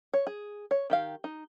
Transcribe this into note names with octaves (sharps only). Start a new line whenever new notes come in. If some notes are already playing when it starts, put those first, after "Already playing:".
C#5
G#4
C#5
D#3 G4 F5
D#4